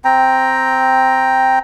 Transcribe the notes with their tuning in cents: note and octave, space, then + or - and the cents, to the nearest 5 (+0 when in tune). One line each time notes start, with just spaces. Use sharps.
C4 +0 G5 +0 A#5 +0